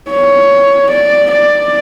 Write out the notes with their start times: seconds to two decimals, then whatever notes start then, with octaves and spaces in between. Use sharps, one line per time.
0.10 C#5
0.90 D5
1.31 D5